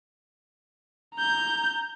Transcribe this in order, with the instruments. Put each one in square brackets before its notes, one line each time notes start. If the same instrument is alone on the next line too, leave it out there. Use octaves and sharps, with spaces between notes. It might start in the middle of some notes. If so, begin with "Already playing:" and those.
[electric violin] A#5 G6